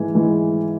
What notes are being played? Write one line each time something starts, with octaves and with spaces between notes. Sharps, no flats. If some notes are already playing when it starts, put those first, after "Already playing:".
Already playing: G#2 E3 G#5
G#2 E3